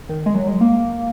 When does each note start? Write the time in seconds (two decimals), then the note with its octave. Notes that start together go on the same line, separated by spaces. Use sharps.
0.09 D#3
0.26 G#3
0.35 F#3
0.48 G#3
0.61 A#3